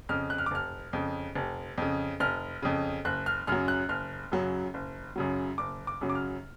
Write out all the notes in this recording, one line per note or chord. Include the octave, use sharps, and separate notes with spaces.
F2 C#3 F6
F#6
F6
D6
F1 F6
F2 C#3
F1
F2 C#3
F1 F6
F2 C#3
F#1 F#6
F6
F#2 C#3 F#3 F6
F#6
F#1 F6
F#2 C#3 F#3
F#1
F#2 C#3 F#3
F#1 D6
D6
F#2 C#3 F#3
D6
F6